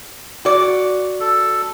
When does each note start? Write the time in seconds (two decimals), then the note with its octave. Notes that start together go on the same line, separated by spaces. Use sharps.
0.45 F#4 D5
1.20 A4